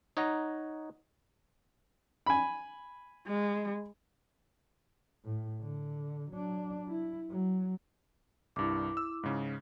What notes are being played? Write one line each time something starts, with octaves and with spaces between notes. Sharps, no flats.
D#4 C#5 D#5 F#5 A#5
G#5 B5
G#3
A2
D3
F#3 D4
E4
F#3
C2 G2 E4 D6
E6
G#2 C#3